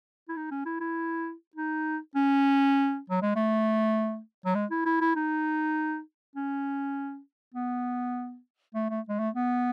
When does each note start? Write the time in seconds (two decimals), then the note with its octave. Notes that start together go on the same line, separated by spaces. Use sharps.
0.29 E4
0.36 D#4
0.51 C#4
0.65 E4
0.80 E4
1.56 D#4
2.15 C#4
3.10 F#3
3.22 G#3
3.36 A3
4.46 F#3
4.55 G#3
4.71 E4
4.86 E4
5.01 E4
5.16 D#4
6.36 C#4
7.54 B3
8.75 A3
8.90 A3
9.09 G#3
9.19 A3
9.34 B3